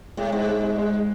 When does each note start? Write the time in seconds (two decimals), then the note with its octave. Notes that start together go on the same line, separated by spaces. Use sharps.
0.17 A2 G#3
0.32 G#2 G#3
0.48 G#3
0.63 G#3
0.78 G#3